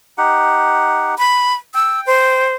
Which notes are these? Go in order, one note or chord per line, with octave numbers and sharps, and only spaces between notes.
D#4 G4 F#5
B5
G5 E6
C5